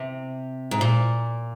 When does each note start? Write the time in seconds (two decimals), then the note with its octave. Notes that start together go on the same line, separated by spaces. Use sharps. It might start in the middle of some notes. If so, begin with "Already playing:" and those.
Already playing: C3
0.71 G#2
0.81 A#2